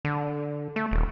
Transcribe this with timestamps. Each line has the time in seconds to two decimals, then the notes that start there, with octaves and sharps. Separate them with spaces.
0.05 D3
0.76 A3
0.91 D#1